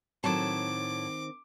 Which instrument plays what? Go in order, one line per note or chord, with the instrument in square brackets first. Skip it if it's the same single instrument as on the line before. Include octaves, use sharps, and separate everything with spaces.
[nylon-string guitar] A2 F#3 A5 [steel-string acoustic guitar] D#3 C4 [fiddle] D6